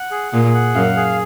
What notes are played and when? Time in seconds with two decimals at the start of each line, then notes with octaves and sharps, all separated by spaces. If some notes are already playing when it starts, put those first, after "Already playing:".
Already playing: F#5
0.11 G#4
0.32 A#2 G#4
0.54 F#5
0.75 F#2 F5
0.96 G#4